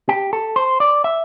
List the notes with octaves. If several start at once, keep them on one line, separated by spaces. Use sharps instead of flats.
G4
A4
C5
D5
E5